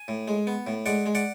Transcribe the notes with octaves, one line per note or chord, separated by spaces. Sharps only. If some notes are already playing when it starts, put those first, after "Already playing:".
Already playing: G#5
A2
G#3
B3
A2
G#3 D5 F#5
G#3
D5 F#5